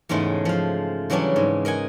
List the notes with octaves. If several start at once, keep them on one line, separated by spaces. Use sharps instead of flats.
E2 G#2 C#3 G#3 A3
F3 F5
C#3 E3 F#3 G3 C#4 D4
G#2
A#4 D#5 F#5 G#5